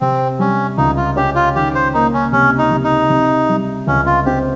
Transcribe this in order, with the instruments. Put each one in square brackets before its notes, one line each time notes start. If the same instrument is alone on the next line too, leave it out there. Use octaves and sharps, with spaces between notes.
[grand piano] C3 [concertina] C4
[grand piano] G3 [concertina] C#4
[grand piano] C#2 [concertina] D#4
[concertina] F4
[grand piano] C#4 [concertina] G4
[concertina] F4
[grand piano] D#3 [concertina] G4
[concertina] C5
[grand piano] A#3 [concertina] D#4
[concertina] C#4
[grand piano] C3 [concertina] C#4
[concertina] D#4
[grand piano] C3
[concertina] D#4
[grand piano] C3
G3
[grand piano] C#2 [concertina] C#4
[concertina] F4
[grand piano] C4 [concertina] G4